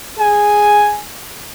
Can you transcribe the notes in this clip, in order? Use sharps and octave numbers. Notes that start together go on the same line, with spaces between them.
G#4 G#5